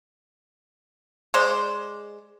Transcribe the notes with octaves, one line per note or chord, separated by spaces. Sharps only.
G#3 C5 D5